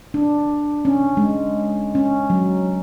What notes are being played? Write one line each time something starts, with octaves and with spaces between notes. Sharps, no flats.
D4
C#4
G#3
C#4
F#3